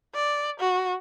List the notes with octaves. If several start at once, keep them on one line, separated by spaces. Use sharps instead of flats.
D5
F#4